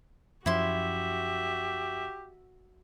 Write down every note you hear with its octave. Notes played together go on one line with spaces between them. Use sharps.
F#2 F3 E4 F#4 G4 E5 C6